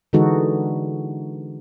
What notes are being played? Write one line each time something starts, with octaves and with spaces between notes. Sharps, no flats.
D3 E3 G#3 D#4 F#4 A4